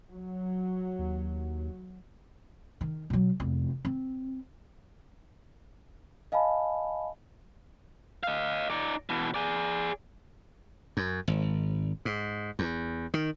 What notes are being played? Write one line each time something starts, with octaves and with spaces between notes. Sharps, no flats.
F#3
D#2
D#3
B2 F#3
F1 E2
C4
D#5 F5 G#5 A5 B5
D#5 F5
D#4 D5
B2 E3
G#4 D5
F#2
G#1
G#2
E2
D#3